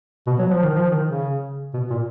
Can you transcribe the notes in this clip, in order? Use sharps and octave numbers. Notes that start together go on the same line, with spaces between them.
B2
F#3
F3
D#3
F3
D#3
C#3
B2
A#2